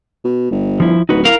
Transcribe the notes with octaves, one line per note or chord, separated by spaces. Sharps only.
B2
G1
F3 E4
D1 D#4 F#4 B4
E4 A#4 F5